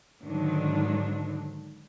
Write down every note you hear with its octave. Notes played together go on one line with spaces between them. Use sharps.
G#2 D3 D#3 F#3 D4 D#4